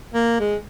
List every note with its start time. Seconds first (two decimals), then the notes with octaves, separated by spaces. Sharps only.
0.14 A#3
0.40 G#3